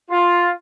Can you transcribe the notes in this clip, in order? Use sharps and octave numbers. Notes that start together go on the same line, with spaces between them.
F4